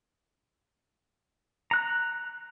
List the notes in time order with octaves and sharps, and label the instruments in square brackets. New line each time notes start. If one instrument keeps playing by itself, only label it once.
[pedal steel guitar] A#5 F#6